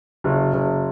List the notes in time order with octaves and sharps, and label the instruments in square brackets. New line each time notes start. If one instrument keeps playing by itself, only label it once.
[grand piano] F#1 [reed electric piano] F#4
[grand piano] F#1